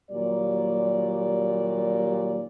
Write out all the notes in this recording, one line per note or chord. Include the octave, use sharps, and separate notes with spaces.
D#2 A#2 F#3 G3 D5